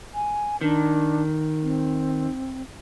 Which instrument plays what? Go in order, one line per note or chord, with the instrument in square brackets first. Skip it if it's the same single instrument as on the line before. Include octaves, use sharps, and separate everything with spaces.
[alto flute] G#5
[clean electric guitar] D#3 [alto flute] D4
[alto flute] C4